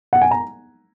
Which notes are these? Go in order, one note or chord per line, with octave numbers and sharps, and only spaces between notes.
F#5
G#5
A#5